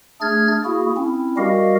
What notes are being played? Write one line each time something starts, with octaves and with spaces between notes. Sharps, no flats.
A3 D4 G#4 F6 G#6 A6
A#3 E4 F#4 G#4
C4 C#4 E4
G3 F#4 G4 A#4 D#5 F5